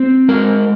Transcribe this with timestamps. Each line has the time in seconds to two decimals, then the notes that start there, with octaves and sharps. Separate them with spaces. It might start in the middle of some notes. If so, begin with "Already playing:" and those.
Already playing: C4
0.28 G#3 A#4